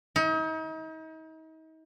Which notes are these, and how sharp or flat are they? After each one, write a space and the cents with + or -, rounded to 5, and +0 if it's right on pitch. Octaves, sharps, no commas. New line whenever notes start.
D#4 +40